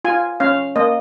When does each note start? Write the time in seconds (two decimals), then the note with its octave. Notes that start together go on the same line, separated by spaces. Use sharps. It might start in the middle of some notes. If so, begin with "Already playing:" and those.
0.05 F4 G#5
0.40 C#4 F5
0.76 A#3 D#5